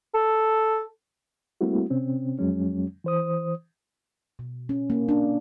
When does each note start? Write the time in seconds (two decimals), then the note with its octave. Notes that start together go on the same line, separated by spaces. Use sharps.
0.14 A4
1.61 G3 A3 A#3 C4 E4 F#4
1.90 C3 C4 C#4
2.39 F2 F#3 G#3 C#4
3.04 E3 C5 D#6
4.39 B2
4.69 C#4
4.90 A#3
5.09 D4